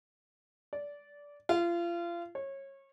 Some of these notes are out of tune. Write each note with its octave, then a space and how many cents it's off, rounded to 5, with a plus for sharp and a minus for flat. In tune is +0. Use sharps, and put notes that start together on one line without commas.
D5 -20
F4 -30
C#5 -25